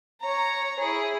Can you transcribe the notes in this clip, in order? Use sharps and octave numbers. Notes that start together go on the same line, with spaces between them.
C#5 A#5
E4 G#4